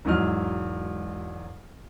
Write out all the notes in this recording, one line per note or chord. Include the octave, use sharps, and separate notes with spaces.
E1 G#2 F#3 D#5 F6